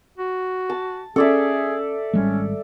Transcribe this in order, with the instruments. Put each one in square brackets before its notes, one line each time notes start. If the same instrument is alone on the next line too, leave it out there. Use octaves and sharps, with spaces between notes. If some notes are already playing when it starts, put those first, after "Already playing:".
[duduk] F#4
[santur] A5
[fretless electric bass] C#4 [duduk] G#4 [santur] A4 D5 E5
[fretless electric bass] G#1 G3 G#3 [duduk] C#4